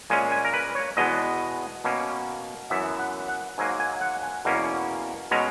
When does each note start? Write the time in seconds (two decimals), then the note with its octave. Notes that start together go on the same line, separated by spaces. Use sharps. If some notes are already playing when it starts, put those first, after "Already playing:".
0.10 A#2 G#3 C#4 G#5
0.32 G#5
0.45 A#4
0.54 B4
0.75 C#5
0.97 E2 B2 G#3 B3 D#5
1.84 B2 A#3 C#4
2.70 F#2 E3 B3 E5
2.99 F#5
3.28 F#5
3.58 G#2 F#3 A#3 G#5
3.80 G#5
4.01 F#5
4.23 G#5
4.45 E2 B2 A#3 C#4
5.31 B2 G#3 C#4 A#5